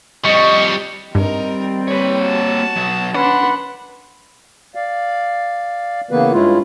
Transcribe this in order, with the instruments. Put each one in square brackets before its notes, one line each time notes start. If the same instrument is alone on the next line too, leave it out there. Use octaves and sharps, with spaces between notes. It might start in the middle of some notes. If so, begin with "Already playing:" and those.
[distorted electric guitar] F2 G3 [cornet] D#5 [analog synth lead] C#6
[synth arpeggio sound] G2 [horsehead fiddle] G3 C4 [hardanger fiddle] D#4 A#4
[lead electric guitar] A#3 C#5 [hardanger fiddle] B4
[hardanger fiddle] F#4 A5
[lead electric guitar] B2 F#3
[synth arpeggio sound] C#4 [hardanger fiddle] D4 C6 [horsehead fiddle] B4 [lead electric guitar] F#5
[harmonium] D5 F5
C#3 E3 A#3 B3 B4
G2 G#3 C#4 E4 F4